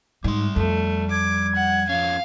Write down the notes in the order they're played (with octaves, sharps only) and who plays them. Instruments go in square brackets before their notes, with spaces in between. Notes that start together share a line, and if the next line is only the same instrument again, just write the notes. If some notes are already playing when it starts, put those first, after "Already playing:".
[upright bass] G#2 [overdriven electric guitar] G3 C6
[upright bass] F2 [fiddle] A3
[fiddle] D6 [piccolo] G#6
[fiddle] F#5
[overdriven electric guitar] F3 C#4 [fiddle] F5